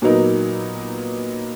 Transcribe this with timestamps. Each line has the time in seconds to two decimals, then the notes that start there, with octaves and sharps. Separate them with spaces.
0.02 A#2 F#3 B3 D#4 A#4